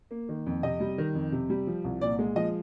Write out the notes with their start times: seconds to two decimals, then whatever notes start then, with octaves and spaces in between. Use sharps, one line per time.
0.11 A#3
0.29 D#3
0.46 F2
0.63 C3 D#5
0.80 G3
0.98 D#3
1.15 F2
1.32 C3
1.50 G3
1.67 F3
1.84 C2
2.01 A#2 D5
2.19 G#3
2.36 F3 D#5